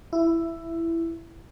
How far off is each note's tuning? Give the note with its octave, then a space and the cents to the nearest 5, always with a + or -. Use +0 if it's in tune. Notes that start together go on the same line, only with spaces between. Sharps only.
E4 +10